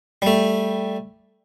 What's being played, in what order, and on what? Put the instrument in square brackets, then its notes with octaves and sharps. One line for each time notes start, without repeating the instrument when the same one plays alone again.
[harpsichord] G3 A3